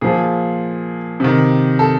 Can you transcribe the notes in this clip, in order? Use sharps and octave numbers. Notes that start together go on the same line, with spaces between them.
A#2 F3 G#4
C3 D#3
A4